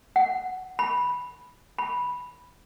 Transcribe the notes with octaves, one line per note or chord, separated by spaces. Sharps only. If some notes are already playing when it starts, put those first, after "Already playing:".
F#5
B5
B5